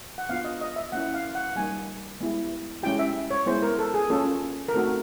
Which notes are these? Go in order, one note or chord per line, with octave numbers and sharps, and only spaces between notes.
F#5
B3 D4 F4 F5
D#5
D#5
E5
A#3 C#4 E4 F#5
F5
F#5
G3 A#3 D#4 G#5
G#3 B3 E4 G4
G#3 C#4 E4 G4 G5
E5
C#5
G#3 B3 E4 C5
A#4
A4
G#4
A#3 C#4 F4 A4
A#4
A3 C4 D#4 F#4 A4